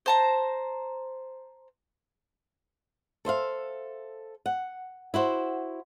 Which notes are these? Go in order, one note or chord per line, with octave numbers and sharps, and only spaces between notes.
C5 A5 A#5
A4 C5 E5 F5
F#5
E4 F#4 C5